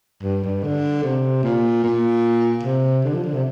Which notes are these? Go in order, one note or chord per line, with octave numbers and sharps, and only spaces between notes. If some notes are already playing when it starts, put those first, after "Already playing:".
G2
G2
D3
C3
A#2
A#2
C3
D3
F3
D3
C3